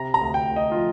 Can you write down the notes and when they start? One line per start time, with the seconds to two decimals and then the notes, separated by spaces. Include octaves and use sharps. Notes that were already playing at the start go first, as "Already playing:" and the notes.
Already playing: C3 A#5
0.14 A#5
0.21 D2
0.34 G5
0.49 D2
0.56 D#5
0.72 F4
0.76 F3